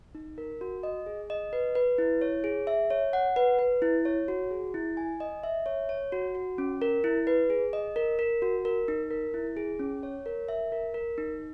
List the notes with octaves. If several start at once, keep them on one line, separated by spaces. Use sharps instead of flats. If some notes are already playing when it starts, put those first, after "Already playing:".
D#4
A#4
F#4
D#5
G#4
D#5
B4
B4
E4
C#5
G#4
E5
C#5
F#5
B4
B4
E4
C#5
F#4
G#4
E4
G#5
D#5
E5
C#5
C#5
F#4
F#4
C#4
A#4
E4
B4
G#4
D#5
A#4
A#4
F#4
A#4
D#4
A#4
E4
G#4
C#4
C#5
A#4
E5
A#4
A#4
D#4